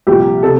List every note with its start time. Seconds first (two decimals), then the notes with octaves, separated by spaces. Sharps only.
0.07 C2 A#2 F3 G4
0.43 C3 A4